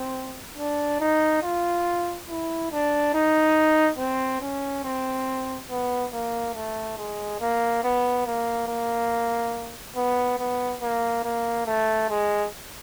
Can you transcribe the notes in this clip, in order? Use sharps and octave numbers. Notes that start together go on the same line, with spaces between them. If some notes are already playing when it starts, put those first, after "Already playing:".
Already playing: C4
D4
D#4
F4
E4
D4
D#4
C4
C#4
C4
B3
A#3
A3
G#3
A#3
B3
A#3
A#3
B3
B3
A#3
A#3
A3
G#3